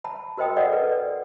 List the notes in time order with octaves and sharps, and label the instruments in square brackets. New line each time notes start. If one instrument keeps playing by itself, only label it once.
[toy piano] A5 B5
F#4 A#4 C5 D#5 G5 D#6
A4 D5 D#5 F#5
A4 B4
D5